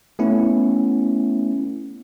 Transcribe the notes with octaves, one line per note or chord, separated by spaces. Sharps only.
A3 B3 C#4 E4